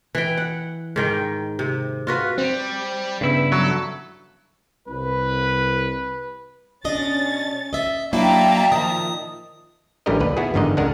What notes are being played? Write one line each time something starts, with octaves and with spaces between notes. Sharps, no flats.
E3 G5
F#5
G#2 D#3 G5
C3
F4 F#4 B4
G3 C4
G2 C#3 B3 E4 E6
F#3 A4
C2 B4
B2 C#4 D4 D#5 A6
D#5 E5
F#3 A#3 D4 E4 E5 G5 A5 A#5
A#2 D#3 F3 D#6
A1 D3 G3 E4 A#4 D#5
D#2 B4
B3 E4 F#4 G#4
G1 E2 G#2 D3 D#3 D#5
C#2 G#3 D4 A#4 F#5